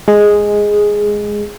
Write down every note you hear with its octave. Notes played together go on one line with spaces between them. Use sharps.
G#3 G#4